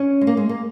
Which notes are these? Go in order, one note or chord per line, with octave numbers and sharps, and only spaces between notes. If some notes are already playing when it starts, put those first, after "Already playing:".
Already playing: C#4
G#3
A#3
G#3
A#3